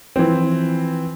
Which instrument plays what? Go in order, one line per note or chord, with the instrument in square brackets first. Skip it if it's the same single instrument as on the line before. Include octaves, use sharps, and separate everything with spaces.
[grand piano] E3 F3 C4